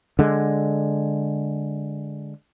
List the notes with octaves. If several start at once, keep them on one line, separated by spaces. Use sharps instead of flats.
D3 G#3